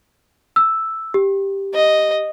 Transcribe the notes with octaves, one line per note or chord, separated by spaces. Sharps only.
E6
G4
D#5